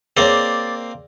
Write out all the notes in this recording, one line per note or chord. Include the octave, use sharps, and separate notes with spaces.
A#3 C4 G#4 C#5 D5